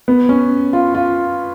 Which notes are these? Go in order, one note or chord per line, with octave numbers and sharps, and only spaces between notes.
B3
C#4
F4
F4